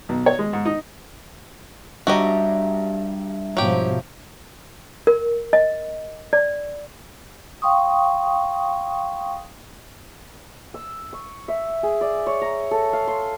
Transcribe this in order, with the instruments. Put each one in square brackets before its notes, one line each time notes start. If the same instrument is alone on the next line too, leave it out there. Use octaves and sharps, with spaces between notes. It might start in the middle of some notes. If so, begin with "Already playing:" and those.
[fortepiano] B1
C#5
G#3
G#2
D#4
[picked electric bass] G3 D4 [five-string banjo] F#4 G4 D#5 [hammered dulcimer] E5 A#5
[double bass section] G#2 B2 F3 [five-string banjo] F#3 G4
[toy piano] A#4
D#5
D5
[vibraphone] F5 G5 C6 C#6 D#6
[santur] E6
C#6
E5
G#4
D5
C#5
A#5
A4
F5
C6